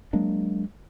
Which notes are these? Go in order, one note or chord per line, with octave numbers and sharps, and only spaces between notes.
F#3 G#3 A#3 D4